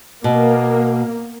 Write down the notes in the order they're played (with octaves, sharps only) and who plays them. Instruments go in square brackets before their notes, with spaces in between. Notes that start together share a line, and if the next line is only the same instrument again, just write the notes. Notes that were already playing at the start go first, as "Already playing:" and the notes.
[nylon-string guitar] B2 [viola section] A#3